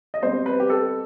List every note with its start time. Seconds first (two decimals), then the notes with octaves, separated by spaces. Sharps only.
0.14 D#5
0.22 B2 G3 C4 C5
0.46 B4
0.60 G4
0.70 A4